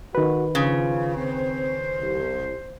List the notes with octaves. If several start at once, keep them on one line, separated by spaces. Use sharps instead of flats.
D#3 F#4 B4
C#3 F3 F4
C4 C5
C2